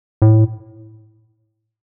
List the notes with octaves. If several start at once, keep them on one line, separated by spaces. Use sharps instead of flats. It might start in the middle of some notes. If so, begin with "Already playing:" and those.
A2